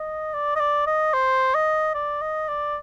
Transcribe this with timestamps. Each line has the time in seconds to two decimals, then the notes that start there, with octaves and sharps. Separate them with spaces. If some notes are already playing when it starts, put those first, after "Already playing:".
Already playing: D#5
0.34 D5
0.56 D#5
0.60 D5
0.87 D#5
1.14 C5
1.55 D#5
1.94 D5
2.22 D#5
2.49 D5